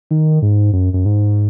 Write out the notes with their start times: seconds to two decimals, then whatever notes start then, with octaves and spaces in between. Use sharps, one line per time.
0.11 D#3
0.42 G#2
0.73 F#2
0.93 F#2
1.05 G#2